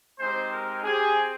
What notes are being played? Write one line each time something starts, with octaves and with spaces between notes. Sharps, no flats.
G#3 C4 D#4 G4 C5
A#4
C4 G4 G#4